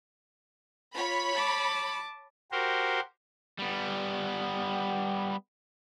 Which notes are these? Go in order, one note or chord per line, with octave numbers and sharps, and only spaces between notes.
F4 C#5 B5
A5 D6
F#4 G4 A#4 C5
G3 B3